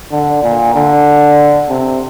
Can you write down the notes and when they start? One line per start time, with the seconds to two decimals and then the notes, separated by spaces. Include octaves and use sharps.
0.11 D3
0.43 A#2
0.74 D3
1.69 C3